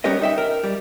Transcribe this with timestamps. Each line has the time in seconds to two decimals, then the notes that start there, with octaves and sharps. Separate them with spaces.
0.04 G3 B3 C#4 G4 A#4 D#5
0.21 D#4 E5 G5
0.38 A#4
0.64 G3